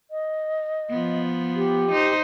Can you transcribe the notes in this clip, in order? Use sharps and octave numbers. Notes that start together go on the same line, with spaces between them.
D#5
F3 B3
G4
D#4 C5